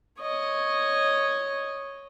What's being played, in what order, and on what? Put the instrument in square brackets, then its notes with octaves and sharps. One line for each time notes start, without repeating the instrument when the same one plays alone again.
[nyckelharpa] C#5 D#5